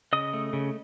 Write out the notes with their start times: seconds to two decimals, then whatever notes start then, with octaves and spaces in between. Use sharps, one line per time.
0.13 C#3 D#5 D#6
0.33 A3
0.53 C#3